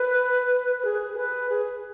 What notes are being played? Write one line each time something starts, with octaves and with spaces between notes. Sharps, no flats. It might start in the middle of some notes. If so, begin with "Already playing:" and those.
Already playing: B4
B4
G#4
G#4
B4
G#4